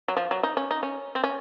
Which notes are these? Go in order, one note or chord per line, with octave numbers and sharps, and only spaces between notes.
F#3
F3
F#3
D#4
C#4
D#4
C#4
C4
C#4